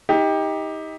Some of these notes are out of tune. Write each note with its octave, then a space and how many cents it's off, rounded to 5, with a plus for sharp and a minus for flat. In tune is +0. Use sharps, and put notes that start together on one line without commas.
D#4 +25 G4 +15